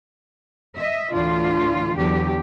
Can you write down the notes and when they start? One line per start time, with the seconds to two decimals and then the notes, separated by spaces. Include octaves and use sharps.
0.75 D#5 E5
1.13 D2 A2 E3 D4 F4 D5
1.97 E2 D3 F#3 G4